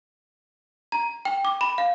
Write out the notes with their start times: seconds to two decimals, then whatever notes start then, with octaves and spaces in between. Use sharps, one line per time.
0.92 A#5
1.25 G5
1.45 D6
1.61 B5
1.78 F5